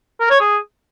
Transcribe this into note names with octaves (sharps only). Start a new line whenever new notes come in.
A#4
C#5
G#4